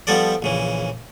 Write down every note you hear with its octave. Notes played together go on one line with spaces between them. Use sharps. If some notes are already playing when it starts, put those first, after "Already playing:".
F3 G3 B3 A4 D5
A#1 C#3 E3